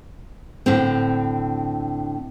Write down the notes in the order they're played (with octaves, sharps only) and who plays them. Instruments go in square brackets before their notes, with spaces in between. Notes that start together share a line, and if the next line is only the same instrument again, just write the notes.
[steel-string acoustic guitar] A2 D3 C4